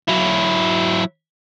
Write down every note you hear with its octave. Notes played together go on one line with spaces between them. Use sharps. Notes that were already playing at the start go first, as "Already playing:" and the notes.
F#3 E4